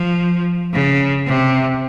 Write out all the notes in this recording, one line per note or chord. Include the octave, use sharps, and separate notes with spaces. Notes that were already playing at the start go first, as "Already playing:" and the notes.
Already playing: F3
C#3
C3